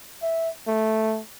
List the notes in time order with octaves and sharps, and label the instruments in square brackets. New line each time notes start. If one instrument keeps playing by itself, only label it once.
[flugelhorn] E5
A3